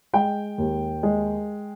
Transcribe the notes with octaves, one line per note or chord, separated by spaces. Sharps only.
G#3 G5
D#2
G#3